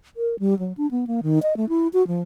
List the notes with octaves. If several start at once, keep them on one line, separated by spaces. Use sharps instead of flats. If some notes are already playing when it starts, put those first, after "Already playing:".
A#4
G3
F#3
D4
B3
A#3
D#3
D#5
A3
E4
F#4
F3